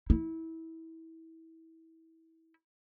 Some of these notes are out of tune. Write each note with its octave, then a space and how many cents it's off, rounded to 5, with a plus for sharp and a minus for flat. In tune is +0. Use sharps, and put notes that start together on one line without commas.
E4 -25